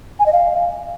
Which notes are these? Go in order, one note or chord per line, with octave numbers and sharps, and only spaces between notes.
G#5
D#5
F5